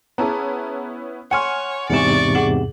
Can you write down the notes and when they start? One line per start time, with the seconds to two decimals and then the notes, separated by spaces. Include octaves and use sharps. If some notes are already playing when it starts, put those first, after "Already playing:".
0.18 B3 C#4 E4 G#4 A5 A#5
1.31 C#5 F#5 G#5 C6 C#6 F6 C#7
1.90 E2 G#2 C3 D5 C#6 C#7 E7
2.35 G#4 F#5 E7 F#7